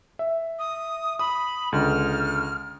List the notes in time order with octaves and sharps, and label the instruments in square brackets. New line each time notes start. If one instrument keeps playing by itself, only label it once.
[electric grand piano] E5
[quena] D#6
[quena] B5 [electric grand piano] D#6
[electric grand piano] C#2 D3 [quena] F6